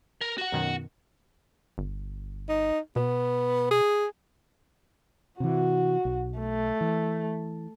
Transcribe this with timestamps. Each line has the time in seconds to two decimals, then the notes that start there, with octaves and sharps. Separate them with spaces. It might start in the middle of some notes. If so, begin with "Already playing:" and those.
0.21 A#4
0.38 F#4 F#5
0.52 F#2 B2 D#3
1.78 G1
2.49 D#4
2.96 B2 B3
3.71 G#4
5.40 C3 E3 F#4
6.05 B1
6.39 A3
6.81 E3